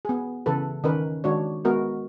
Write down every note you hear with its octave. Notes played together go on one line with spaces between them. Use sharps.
B3 G#4
C#3 E3 A4 B4
D#3 C#4 A#4 B4
D#3 G#3 D4 F#4 C#5
G#3 B3 F#4 A#4